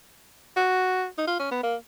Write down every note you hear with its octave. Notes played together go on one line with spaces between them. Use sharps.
F#4
D#4
F4
C#4
B3
A#3